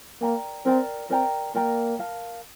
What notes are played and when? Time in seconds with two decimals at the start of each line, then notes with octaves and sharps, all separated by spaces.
0.21 A#3 A#4 D5 G5 A#5
0.65 C4 A#4 D5 G5 A#5
1.10 C4 A#4 D5 G5 A#5
1.55 A#3 A#4 D5 G5 A#5
1.99 A#4 F5 A5